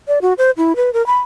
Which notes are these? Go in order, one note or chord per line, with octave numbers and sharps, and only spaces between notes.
D5
F#4
C5
E4
B4
A#4
B5